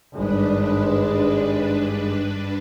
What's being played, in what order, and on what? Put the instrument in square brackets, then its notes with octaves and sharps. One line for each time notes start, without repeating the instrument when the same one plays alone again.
[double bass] G#1 G#3 [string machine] G2 D4 B4